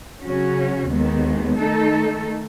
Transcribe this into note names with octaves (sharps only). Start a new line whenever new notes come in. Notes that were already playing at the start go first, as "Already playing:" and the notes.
C#3 F#3 C#4 F#4
D#2 D#3 G#3 B3
D#3 A3 D#4 A4